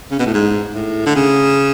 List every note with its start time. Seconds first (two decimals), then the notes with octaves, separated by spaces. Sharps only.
0.11 C#3
0.19 B2
0.27 A2
0.34 G#2
0.74 A2
1.06 D3
1.16 C#3